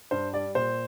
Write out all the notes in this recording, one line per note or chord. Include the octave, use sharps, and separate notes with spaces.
G2 C5
G3 D5
A#2 C5